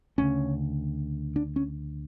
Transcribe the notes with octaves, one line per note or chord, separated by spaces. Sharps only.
D2 C#3 C#4
D4
C#4